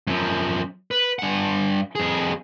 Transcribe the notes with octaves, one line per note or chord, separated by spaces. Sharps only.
F#2 F3
B4
G2 F#5
F2 G#4